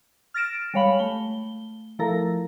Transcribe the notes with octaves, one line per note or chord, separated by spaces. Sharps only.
F6 A6 A#6 D7 E7
G3 G#3 C#5 F5 B5 F#7
A3 G7
F3 A3 E4 A4 A#4 A#5